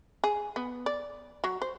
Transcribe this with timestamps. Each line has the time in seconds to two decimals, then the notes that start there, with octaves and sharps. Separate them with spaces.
0.24 G#4
0.56 B3
0.86 D5
1.44 F#3
1.62 C5